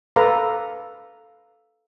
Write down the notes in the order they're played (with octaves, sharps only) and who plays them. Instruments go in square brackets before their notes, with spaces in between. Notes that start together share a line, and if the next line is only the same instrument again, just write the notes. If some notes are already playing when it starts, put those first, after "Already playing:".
[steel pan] A4 B4 F5 A#5 C6 D6